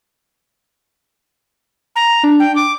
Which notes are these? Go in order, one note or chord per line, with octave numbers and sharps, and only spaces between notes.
A#5
D4
G5
D6